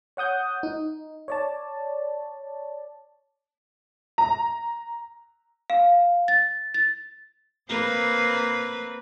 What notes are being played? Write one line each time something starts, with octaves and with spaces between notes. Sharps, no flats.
C#5 F#5 D#6 G6
D#4
C#5 D5 A5
A#5
F5
A6
A6
A#3 C4 B4